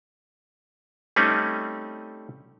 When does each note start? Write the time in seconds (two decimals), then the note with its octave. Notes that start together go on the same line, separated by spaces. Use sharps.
1.16 G3 A3 C4 C#4 D#4